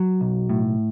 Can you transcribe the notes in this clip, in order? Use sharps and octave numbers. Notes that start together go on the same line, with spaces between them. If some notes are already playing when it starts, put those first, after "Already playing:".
Already playing: F#3
B1
A2